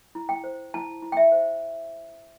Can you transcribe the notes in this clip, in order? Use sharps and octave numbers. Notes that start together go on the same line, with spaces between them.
E4
G5
C5
E4 A5
E4
G5
E5
C5